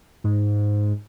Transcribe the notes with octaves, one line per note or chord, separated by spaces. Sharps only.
G#2